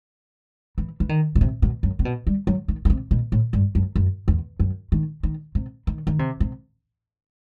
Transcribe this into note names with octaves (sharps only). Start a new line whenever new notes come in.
E3
E3
D#3
B2
C3
B2
F#2
C3
B2
G3
F#3
D#3
D#3
C3
B2
A2
G2
F#2
F#2
E2
F#2
D#3
D#3
C3
D#3
D#3
C3
C3